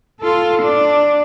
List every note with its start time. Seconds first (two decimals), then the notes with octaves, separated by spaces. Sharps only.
0.20 F4 A4
0.62 D4